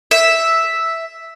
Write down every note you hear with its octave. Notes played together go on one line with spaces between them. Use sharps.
E5